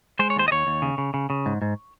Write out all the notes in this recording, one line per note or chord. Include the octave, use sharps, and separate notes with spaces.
G#3 C5
C#5
D#2 C5
D#5
D#2 C#5
D#2
C#3
C#3
C#3
C#3
G#2
G#2